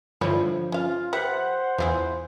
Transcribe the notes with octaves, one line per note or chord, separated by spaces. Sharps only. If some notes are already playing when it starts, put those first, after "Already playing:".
G2 D3 E3 F3 C5 C#5 B5
C#4 F4 F5
G4 B4 C5 E5 F#5
E2 B3 E4 F4 G#4